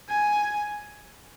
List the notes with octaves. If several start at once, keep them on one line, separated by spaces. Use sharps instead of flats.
G#5